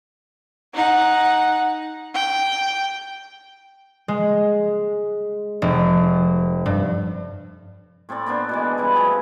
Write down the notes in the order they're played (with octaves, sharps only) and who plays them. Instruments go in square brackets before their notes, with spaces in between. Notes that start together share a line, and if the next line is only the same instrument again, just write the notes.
[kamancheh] D#4 F#5
G5
[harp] G#3
F1
G2
[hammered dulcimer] A2 C4 A4 D5
A#3 B3 D4 C5
B2 E3 G#3
C#3 E3 G3
F3 A3 E4 G#4